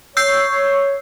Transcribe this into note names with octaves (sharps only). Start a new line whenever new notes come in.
C#5 E6 G6 C7